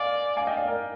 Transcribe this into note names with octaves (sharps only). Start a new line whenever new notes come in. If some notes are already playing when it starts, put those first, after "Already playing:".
Already playing: D5 D#5 F5 G#5
F5 G#5
D#5 G5
D5 F5
A#4 D5